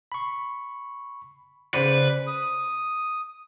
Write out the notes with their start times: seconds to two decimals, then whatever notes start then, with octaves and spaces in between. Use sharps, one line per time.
0.12 B5 C#6
1.74 C#3 B4 C5 D5
2.27 D#6